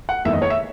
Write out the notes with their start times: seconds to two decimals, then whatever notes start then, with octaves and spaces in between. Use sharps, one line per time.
0.09 F#5
0.25 F#1 E2 D#3 G#3 E5
0.33 D#5
0.42 C#5
0.50 E5